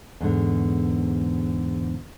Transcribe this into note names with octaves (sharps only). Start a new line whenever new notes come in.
E2 G#2 D3